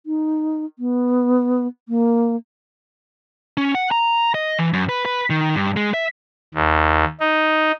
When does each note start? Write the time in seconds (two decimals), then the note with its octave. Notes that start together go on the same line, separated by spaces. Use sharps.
0.06 D#4
0.79 B3
1.88 A#3
3.57 C#4
3.75 F#5
3.91 A#5
4.34 D#5
4.59 E3
4.73 F#2
4.89 B4
5.05 B4
5.30 D#3
5.56 G2
5.77 G#3
5.94 E5
6.54 D#2
7.20 D#4